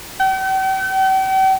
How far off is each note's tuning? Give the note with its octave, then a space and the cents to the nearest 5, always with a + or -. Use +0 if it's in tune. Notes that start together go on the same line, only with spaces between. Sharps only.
G5 -45